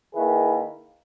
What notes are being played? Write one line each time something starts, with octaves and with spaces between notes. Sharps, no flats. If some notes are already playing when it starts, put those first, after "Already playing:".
D#3 A#3 E4 G#4 B4